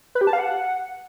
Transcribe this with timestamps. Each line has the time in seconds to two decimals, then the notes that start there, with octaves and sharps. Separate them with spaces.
0.15 B4
0.21 G4
0.27 A5
0.33 F5
0.39 F#5